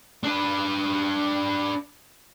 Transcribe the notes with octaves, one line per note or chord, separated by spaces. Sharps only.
D4 B4